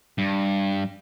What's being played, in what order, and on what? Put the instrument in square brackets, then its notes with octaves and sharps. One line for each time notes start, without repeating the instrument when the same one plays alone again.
[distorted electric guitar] G2